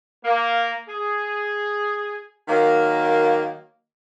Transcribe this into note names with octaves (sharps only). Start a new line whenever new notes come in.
A#3
G#4
D#3 F#3 A#3